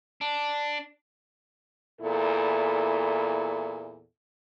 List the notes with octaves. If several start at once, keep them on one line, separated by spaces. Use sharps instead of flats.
D4
E2 A#2 E4 A4